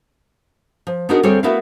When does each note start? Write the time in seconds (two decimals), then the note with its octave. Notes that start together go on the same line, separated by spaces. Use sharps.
0.87 F3
1.09 B3 D4 D#4 F#4 G#4 A#4
1.23 D2 G3 C4 G#4 A4 C#5
1.43 A3 B3 E4 F#4 A#4 F5